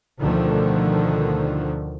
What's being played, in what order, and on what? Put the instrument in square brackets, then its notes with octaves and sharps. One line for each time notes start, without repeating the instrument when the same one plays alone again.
[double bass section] D2 B2 D3 D#3 F3 A3